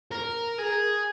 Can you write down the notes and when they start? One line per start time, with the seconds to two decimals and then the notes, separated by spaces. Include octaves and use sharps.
0.12 A#4
0.59 G#4